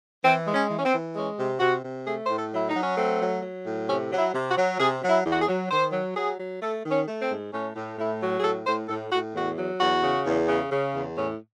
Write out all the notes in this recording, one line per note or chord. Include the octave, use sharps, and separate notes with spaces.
E3 C4
G#3
C#4
E3
C#4
C4
E3
G#3 C#4
C3
C3 F#4
C3
A3 G#4
A2 C5
A4
F#3 E4
D#4
F#3
C#4
A3 C4
F#3
F#3
A2
C3 C#4
F#3
E4
C3
F#4
F#3
C3 G#4
F#3
E4
E2
F#4
G#4
F#3
D#3 C5
F#3
F#3 G#4
F#3
A3 A4
D#3
C#4
A3
C4
G#2
A2 C#4
A2
A2 E4
F#3
G#4
A2 A4
A2 C5
A2 A4
A2 F#4
E2 F#4
F#3
E2 F#4
C#3
E2
C#3
C#3
E2
A2 C#4